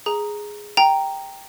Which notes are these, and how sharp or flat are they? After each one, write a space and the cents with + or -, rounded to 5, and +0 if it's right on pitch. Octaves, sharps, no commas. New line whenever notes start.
G#4 +0 A#5 +0
G5 +0 A#5 +0